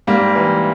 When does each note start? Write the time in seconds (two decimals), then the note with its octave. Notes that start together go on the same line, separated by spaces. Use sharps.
0.07 G#2 G3 A#3
0.35 E3